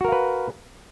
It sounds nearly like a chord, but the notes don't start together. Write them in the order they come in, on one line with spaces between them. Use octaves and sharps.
F#4 A#4 F5 B4